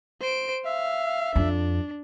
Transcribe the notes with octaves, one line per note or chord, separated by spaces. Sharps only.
C5 D7
E5 F5
F2 D4